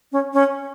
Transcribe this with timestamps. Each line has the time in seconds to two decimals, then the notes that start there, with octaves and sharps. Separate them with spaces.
0.12 C#4
0.34 C#4